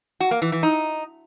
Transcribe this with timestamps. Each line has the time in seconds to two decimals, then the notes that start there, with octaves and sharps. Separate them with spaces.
0.20 F#4
0.31 A#3
0.42 E3
0.52 E3
0.63 D#4